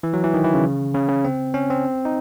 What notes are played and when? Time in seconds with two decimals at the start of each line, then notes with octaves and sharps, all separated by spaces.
0.03 E3
0.14 F#3
0.24 E3
0.34 D#3
0.44 E3
0.54 C#3
0.94 C#3
1.09 C#3
1.25 C4
1.54 C#4
1.70 C4
2.05 D#4